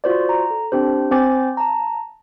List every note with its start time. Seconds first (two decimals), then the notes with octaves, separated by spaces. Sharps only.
0.04 F4 F#4 C5 D5
0.29 A#5
0.50 A4
0.72 C4 D4 G4 C5
1.11 C4 C5 G#5 D6 A6
1.57 A5 A#5